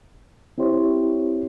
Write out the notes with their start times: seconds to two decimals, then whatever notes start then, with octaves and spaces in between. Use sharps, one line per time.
0.58 C4 E4 G4 C5 C#5